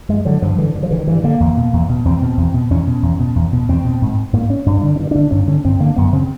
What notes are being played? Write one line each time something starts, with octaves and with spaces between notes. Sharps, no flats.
G2 G#3
D3 F#3
G2 F3
D3 E3
G2
F3
D3 E3
D#3
G2 E3
D3 A#3
E2
B2
E2
B2
E2 C4
B2
E2
B2
E2 C#4
B2
E2
B2
E2
B2
E2 C4
B2
G#2
G#2 A#3
C#4
G2 D4
D3 D4
D4
G2
D3 D4
G2 C#4
D3 C#4
G2 C4
D3 A#3
F#2 B3
C#3 C4